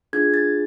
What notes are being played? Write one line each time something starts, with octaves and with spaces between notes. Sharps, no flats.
D4 F4 G#4 G#6
A6